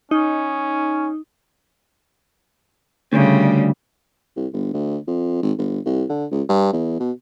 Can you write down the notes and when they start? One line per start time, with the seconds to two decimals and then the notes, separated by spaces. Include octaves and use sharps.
0.11 C#4 D#4
3.13 D2 C#3 G3
4.36 C2
4.53 G1
4.74 D2
5.08 F2
5.43 G#1
5.58 G1
5.86 C2
6.10 D3
6.32 C#2
6.49 G2
6.73 E2
7.00 B2